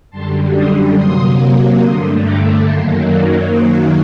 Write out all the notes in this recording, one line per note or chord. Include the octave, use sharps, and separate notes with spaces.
F#2 D3 G3 A5 C6
C6 D#6
C3 F#3 A#3 C6 D#6
G2 D3 A3 C6 D#6
A#5 D6
F#2 D#3 F#3 A#3 A5 C6
D5 F#5
F#2 D#3 F#3 A#3 C5 D#5